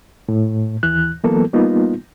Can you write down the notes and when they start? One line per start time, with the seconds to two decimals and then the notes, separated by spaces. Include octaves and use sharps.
0.29 A2
0.83 D#2 E3 F#6
1.24 E3 F#3 A#3 B3 A4
1.53 G3 A#3 B3 D#4 F4